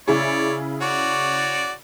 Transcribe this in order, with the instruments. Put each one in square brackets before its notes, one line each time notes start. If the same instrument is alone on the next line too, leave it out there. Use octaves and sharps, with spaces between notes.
[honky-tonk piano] C#3 E4 G#4 [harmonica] C#5 D5
[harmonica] F#4 C#5 D5